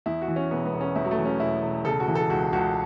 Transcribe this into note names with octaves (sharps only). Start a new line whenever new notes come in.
E2 E4
F#4
E3
C#4
E1 B3
B3
E1
C#4
E2 E4
F#3
A3
E3
C#4
E1 E4
E1
C#3 A4
F#4
E3
A4
C#2 F#4
C#2 F#4